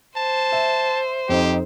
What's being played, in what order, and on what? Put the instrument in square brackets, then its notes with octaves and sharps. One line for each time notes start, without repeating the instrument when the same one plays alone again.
[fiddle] C5 [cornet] A5
[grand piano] E5
[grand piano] F2 C4 D#4 [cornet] G4